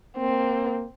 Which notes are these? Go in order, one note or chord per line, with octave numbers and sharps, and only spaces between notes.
A#3 C4